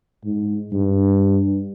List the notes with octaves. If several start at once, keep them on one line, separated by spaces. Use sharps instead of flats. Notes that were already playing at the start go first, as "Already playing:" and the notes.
G#2
G2